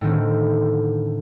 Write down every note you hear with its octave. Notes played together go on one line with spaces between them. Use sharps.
A2 D3 D#3 C4